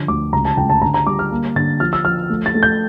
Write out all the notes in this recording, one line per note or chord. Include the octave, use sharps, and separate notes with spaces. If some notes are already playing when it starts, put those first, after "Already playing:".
Already playing: D3 F3
D2 D6
C#2 A#5
A5
C#2 G5
A5
D3 A#5
A#5
G3 D6
F6
A#3
D3 A6
F3 F6
E6
F3 F6
A3
A6
A3
G6